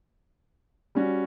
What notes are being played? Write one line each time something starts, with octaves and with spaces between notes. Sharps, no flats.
G3 C#4 F#4